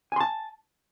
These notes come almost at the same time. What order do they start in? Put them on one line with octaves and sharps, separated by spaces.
G#5 C6 A5